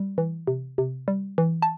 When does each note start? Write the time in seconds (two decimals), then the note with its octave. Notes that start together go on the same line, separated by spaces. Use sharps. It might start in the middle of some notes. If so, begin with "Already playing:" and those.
Already playing: G3
0.18 E3
0.47 C3
0.78 C3
1.08 G3
1.38 E3
1.62 A5